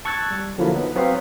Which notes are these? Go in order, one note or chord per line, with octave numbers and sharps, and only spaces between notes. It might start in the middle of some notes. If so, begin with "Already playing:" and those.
A5 C#6 E6 F#6 G#6 A6
G3
D3 F3 F#3 A#3 E4
B3 D#4
F#3 B3 C4 F#4 C5 F5